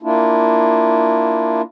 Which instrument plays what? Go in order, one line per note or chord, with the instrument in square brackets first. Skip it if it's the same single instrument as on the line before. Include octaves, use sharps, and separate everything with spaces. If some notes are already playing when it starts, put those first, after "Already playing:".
[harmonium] A#3 D4 E4 F4